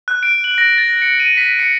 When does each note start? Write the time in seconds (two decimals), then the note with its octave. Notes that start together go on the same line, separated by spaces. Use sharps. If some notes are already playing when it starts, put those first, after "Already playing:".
0.08 F#6
0.23 D7
0.44 F#7
0.58 A#6
0.78 A6
0.89 A#6
1.02 C#7
1.20 D#7
1.37 B6
1.59 C#7